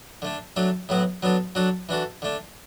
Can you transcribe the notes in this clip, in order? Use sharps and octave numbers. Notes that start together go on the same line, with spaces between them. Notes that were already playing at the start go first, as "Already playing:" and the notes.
D3 A3 D4
F#3 A3 D4 A4
A2 F#3 B3 F#4
F#3 B3 D4 A4
F#3 D4 F#4 A4
E3 D4 F#4 A4
D3 A3 D4